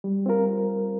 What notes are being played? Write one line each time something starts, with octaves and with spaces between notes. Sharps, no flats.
G3
C4 F4 A#4